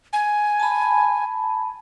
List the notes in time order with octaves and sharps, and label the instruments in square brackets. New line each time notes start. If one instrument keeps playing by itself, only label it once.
[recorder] G#5
[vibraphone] A5 B5